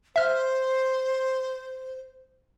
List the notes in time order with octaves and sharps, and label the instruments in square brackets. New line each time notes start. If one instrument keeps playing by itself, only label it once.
[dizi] C5 [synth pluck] E5 F6